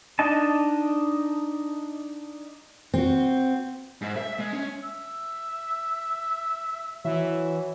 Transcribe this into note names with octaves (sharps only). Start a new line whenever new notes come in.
D4 D#4 D#5 A5
C4 F#4
G#2
E5
G#3
C#4
E5
E3 F#3 E5